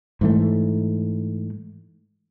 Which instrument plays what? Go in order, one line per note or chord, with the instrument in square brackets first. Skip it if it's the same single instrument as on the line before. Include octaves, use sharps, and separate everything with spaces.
[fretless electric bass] G#2 E3 A3